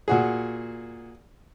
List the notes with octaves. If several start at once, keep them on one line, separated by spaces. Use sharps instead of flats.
A#2 F#4 G#4